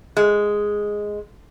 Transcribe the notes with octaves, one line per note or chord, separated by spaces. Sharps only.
G#3